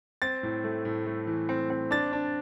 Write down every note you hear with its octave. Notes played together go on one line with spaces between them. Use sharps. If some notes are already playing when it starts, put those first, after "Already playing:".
C4 A6
A2
A3
A2
A3
E3
C4
C4
D4 A6
D4